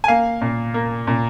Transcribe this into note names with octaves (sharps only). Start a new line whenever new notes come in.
G#5
A#3 F5
A#2
A#3
A#2